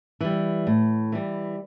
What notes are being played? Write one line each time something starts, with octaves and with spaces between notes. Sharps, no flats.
E3 G3
A2
E3 G3